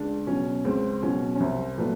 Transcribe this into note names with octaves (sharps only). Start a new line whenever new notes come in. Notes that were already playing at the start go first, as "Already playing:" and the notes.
Already playing: C#2 D4
B2 F#3 C#4
C#2 C4
B2 F#3 C#4
C#4
C2 C4
A#2 F#3 A3 B3